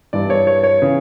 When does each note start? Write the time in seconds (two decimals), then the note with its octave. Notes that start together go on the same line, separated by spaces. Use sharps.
0.13 G2 E3 D5
0.30 C#5
0.47 C#5
0.64 C#5
0.82 C#3 E3